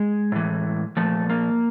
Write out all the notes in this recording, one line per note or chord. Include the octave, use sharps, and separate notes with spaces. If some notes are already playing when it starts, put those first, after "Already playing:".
Already playing: G#3
A2 E3
A#2 F3 A3
A#3